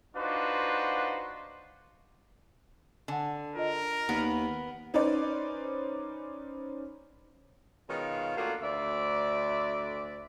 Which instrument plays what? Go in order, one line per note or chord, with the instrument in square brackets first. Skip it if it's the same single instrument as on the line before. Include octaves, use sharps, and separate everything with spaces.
[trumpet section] D4 D#4 F4 F#4 B4 C5
[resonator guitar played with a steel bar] D3 [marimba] F#5 G#5
[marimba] F4 D#5 [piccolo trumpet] A#4
[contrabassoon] D#2 [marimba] D#3 [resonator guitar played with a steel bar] B3
[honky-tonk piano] C#4 D#4 B4 C5 D5
[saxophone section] B2 D#3 G#3 F4 C#5 F5
A3 A#3 D4 F4 F#4
D2 D5 E5